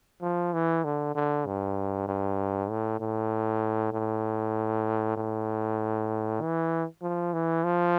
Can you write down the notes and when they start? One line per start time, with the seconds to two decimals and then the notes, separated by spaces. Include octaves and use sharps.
0.22 F3
0.53 E3
0.85 D3
1.15 D3
1.46 G2
2.08 G2
2.70 A2
3.00 A2
3.93 A2
5.17 A2
6.41 E3
7.02 F3
7.33 E3
7.64 F3